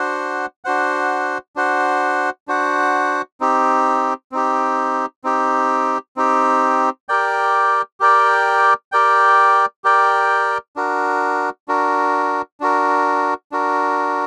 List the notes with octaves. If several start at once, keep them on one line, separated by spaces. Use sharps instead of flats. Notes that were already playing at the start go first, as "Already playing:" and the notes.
Already playing: D4 F#4 C5 F#5
D4 F#4 C5 F#5
D4 F#4 C5 F#5
D4 F#4 C5 F#5
C4 D#4 G4
C4 D#4 G4
C4 D#4 G4
C4 D#4 G4
G4 A#4 D5 G5
G4 A#4 D5 G5
G4 A#4 D5 G5
G4 A#4 D5 G5
D4 F#4 A#4
D4 F#4 A#4
D4 F#4 A#4
D4 F#4 A#4